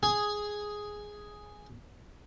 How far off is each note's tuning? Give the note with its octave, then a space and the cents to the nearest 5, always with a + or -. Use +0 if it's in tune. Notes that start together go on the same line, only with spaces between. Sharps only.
G#4 +0 G#5 +0 D#6 +10